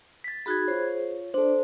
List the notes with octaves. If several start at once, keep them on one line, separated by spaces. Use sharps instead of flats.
A6 B6
D#4 F#4 G#4 B5 F#6 G#6
F4 G#4 C5 C#5
D4 A4 C5 D5